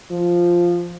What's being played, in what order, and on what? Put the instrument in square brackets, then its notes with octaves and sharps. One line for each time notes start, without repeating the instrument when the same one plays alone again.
[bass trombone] F3